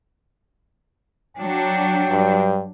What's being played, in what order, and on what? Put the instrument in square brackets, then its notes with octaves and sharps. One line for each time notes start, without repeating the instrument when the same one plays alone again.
[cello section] F#3 D4 [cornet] G5
[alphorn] G2